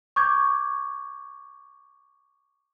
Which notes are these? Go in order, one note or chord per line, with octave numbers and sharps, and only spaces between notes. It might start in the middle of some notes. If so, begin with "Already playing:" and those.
C#6 D6 G6 G#6